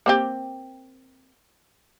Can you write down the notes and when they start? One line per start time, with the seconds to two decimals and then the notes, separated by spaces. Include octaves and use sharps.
0.06 A#3 C4 G4